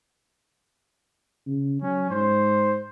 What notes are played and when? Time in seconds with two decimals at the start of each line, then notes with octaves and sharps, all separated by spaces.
1.46 C#3
1.82 F#3 C#4
2.10 G#2 C5